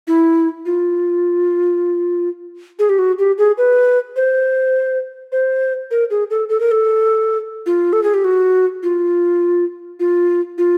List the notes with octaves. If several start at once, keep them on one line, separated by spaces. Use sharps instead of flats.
E4
F4
G#4
G4
F#4
G4
G#4
B4
C5
C5
A#4
G#4
A4
A4
A#4
A4
F4
A4
G#4
G4
F#4
F4
F4
F4